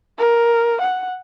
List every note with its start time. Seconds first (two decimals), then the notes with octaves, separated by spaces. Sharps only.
0.18 A#4
0.81 F#5